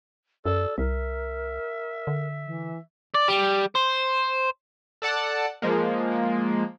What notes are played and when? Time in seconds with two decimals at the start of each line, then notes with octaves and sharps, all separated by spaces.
0.45 F#2 A4 D5
0.78 C2 A#4 E5
2.07 D3
2.46 E3
3.14 D5
3.28 G3
3.75 C5
5.02 A4 D5 F#5 A5
5.62 F3 G#3 A#3